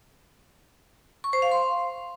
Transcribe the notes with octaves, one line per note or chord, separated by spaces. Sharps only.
C#6
C5
F5
C6